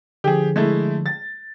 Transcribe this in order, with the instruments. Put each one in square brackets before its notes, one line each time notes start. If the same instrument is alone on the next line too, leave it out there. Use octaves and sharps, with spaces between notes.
[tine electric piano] D3 F3 [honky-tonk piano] G4 G#4
[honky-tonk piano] G#3 A3 E4
A6